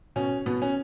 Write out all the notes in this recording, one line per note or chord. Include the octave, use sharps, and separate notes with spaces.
B2 C#4
B2 B3
C#4